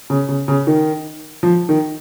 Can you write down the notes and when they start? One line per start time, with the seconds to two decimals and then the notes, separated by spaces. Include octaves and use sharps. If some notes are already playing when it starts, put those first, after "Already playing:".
0.10 C#3
0.29 C#3
0.48 C#3
0.67 D#3
1.43 F3
1.69 D#3